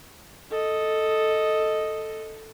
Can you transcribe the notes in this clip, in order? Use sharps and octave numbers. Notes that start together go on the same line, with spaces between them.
A4 D#5